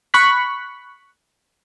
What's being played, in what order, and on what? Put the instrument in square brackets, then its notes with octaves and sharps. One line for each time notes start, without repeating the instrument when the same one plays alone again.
[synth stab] B5 C#6 F#6 B6